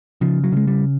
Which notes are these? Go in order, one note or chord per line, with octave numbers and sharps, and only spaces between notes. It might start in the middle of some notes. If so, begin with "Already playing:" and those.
C#3 F3
F#3
C#3 G#3
G3